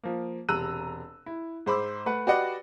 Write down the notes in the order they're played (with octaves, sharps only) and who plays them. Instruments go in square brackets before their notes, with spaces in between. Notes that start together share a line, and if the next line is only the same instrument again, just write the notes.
[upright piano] F3 A#3
E1 C3 A#5 E6 F#6 D#7
E4
G#2 C5 B5 D6 E6
A3 B4 F#5
F#4 G4 B4 D5 D#5 F#5